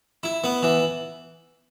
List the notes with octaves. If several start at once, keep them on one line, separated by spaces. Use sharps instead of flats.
E4
B3
E3